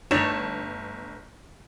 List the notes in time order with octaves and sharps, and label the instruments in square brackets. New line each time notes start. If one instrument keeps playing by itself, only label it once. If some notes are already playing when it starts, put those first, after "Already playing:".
[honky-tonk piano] G1 E7 [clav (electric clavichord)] A3 [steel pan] D4 D#4 D#5 [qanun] C#5